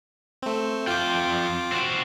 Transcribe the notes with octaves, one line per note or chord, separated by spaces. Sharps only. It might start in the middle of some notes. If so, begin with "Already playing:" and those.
A3 C4
F2 F4 G5 D6
C4 F#4